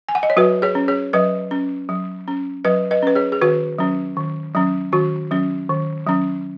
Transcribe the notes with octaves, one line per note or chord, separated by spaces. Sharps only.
G#5
F#5
D#5
C#5
F#3 F#4 B4
G#4 C#5
C#4
G#4 C#5
F#3 B4 D#5
C#4
F#3
C#4
F#3 B4 D#5
B4 D#5
C#4 B4
G#4 C#5
G#4
D#3 F#4 B4
F#3 C#4
D#3
F#3 C#4
D#3 F#4
F#3 C#4
D#3
F#3 C#4